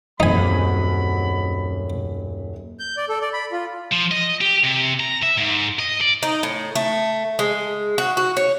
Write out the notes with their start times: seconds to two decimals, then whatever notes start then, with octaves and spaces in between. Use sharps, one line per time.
0.20 D#1 F#2 F#3 G#3 C4 D#4 G#5 B5
2.79 G6
2.97 D5
3.09 A4
3.21 D5
3.33 B5
3.52 F4
3.92 F3
4.11 D#5
4.41 G4
4.64 C3
5.00 A#5
5.23 E5
5.37 G#2
5.79 D#5
6.01 D5
6.23 D#4
6.43 A2
6.75 A3
7.39 G#3
7.98 F#4
8.17 F#4
8.37 C#5